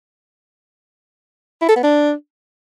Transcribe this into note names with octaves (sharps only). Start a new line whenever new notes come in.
E4
A4
B3
D4